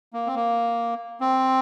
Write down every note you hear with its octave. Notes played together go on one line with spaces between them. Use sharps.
A#3
C4
A#3
C4